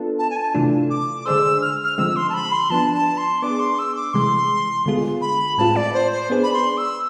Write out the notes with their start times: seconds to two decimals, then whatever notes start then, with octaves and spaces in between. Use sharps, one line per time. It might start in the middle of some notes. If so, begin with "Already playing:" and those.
Already playing: B3 D4 F4 A4
0.19 A5
0.30 G#5
0.37 A5
0.55 C3 E3 A3 D4 F4
0.90 D6
1.26 D3 G#3 D4 G#4 C5 E6
1.61 F6
1.85 F6
1.98 D3 F3 G#3 C4 E6
2.16 C6
2.30 A5
2.34 B5
2.52 C6
2.70 F3 B3 D4 A5
2.94 A5
3.17 C6
3.42 B3 D4 G#4 D6
3.60 C6
3.79 E6
3.96 D6
4.14 C3 E3 G#3 C6
4.86 D3 G#3 B3 F4 G#4
5.21 B5
5.58 A2 G#3 C4 F4 B4 A5
5.76 D5
5.94 C5
6.11 C5
6.30 B3 D4 G#4 B4 D5
6.43 B5
6.53 C6
6.78 E6